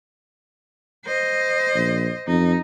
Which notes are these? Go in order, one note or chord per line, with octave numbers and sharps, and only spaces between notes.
C5 D#5
A#1
F2 D#4